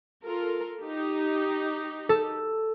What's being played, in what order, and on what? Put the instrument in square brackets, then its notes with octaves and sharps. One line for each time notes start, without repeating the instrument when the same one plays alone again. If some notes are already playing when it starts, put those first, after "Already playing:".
[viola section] F4 A4 A#4
D#4 G4
[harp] A4